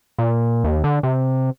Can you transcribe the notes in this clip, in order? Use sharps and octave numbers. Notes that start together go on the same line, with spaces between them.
A#2
D#2
D3
C3